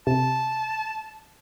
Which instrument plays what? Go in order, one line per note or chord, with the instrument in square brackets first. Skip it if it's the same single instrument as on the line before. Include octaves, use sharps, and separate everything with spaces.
[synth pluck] C3 [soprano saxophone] A5